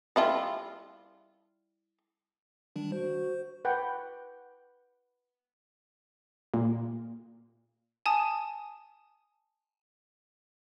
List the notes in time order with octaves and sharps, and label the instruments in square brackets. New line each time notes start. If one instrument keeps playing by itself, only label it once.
[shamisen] G3 E4 F4
[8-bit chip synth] D#3 G3 D4
[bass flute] F#4 [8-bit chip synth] C5
[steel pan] B4 F#5 G5
[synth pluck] A#2
[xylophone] G#5 A5 D#6